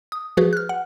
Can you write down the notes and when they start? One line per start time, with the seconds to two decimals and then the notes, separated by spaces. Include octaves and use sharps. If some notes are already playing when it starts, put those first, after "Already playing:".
0.12 D#6
0.37 F3 F#4 G#4 B4
0.53 F6 F#6
0.69 F#5